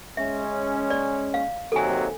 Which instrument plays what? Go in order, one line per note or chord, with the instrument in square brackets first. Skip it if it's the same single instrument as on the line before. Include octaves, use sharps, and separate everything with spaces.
[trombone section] G#3 C#4 [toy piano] E5
[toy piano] D5
F5
[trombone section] D#2 C3 F#3 [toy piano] A4 G#5